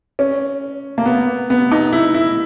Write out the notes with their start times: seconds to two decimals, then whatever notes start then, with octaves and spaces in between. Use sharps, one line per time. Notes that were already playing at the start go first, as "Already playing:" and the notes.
0.19 C#4
0.98 A#3
1.06 B3
1.50 B3
1.72 D#4
1.93 E4
2.14 E4